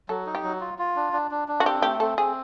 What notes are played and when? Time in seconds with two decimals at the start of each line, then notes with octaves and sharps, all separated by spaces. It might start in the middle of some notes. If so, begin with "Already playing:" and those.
0.09 F#3 A4
0.26 D#4
0.35 G4
0.43 F#3
0.61 F4
0.79 F4
0.96 D4
1.13 D4
1.31 D4
1.48 D4
1.60 F#4
1.66 C4 G4
1.82 A3 G4
2.00 C4 A4
2.18 C4 G#4